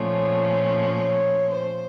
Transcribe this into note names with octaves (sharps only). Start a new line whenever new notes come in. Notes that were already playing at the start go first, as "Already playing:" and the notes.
Already playing: A#2 F3 A3 C#4
C#5
C5